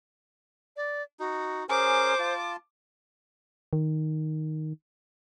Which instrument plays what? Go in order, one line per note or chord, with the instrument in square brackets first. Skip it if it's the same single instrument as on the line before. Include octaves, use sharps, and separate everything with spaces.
[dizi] D5
[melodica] D#4 [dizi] F#4
[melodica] C#4 G#4 A#4 [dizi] C5 [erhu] D6
[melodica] F4 A5
[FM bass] D#3